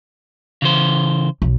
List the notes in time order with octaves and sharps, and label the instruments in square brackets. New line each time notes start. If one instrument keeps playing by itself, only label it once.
[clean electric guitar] C#3 E3 C5
[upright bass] B1